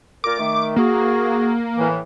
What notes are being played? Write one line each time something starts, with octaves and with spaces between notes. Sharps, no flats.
A#2 F4 A#4 D6
D#3 A3
A#3 F#4 G#4
A2 E3